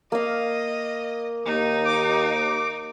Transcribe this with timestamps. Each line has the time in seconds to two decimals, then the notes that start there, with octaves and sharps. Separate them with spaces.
0.12 A#3 D#5 F5
1.46 D#2 D#4
1.85 D6